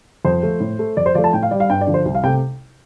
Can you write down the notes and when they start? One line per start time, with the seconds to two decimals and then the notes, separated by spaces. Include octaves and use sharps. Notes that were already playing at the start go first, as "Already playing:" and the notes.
0.25 F2 C5
0.43 F3 A3
0.60 A2
0.79 A3
0.97 F2 D5
1.06 C5
1.15 F3 A3 D5
1.24 A5
1.33 A2 G5
1.43 F5
1.51 G3 D5
1.60 F5
1.70 G2 G5
1.81 D5
1.87 D3 F3
1.94 C5
2.06 C2
2.15 F5
2.23 C3 A3 G5